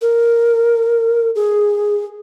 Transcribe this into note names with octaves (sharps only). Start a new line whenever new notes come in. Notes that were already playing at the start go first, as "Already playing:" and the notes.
A#4
G#4